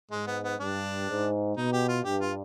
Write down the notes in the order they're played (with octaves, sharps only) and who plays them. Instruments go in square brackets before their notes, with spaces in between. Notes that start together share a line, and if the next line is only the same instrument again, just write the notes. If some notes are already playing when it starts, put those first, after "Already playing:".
[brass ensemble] G#2 [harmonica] G#3
[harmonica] B3
B3
[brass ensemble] G2 [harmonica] D4
[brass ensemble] G#2
[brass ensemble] B2 [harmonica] D#4
[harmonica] G4
F4
[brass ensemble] G2 [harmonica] G4
[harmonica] F4